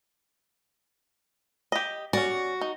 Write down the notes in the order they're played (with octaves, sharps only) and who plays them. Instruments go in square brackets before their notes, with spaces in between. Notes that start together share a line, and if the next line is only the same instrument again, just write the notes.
[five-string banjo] G4 D#5
[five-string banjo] C#4 D5 [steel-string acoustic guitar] F#4
[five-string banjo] D#4